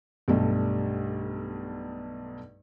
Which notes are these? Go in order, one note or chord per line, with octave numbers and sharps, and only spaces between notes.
B1 G2 G3 A3